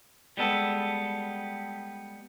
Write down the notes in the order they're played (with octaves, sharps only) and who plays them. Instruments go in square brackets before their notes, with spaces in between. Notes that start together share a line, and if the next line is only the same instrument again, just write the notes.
[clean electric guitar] G3 G#3 B3 A4